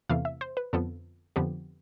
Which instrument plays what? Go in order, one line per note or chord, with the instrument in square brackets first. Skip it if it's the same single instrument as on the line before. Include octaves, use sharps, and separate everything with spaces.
[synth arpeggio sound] E2 C3 E3 A3 E4 F5
E5
C5
B4
F2 D3 F3 B3 A4
F2 D3 F3 B3 G4